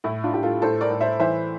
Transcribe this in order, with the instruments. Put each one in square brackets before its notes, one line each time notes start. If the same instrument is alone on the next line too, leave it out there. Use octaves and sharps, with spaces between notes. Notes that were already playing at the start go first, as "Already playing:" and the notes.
[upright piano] A2 E4
D4 F4
A2 G4
F4 A4
A2 A4 C5
A#4 D5
A2
C5 E5
E3 C5 E5